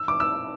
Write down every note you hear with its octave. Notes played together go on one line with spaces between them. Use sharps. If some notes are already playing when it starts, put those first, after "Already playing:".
Already playing: E6
D6
E6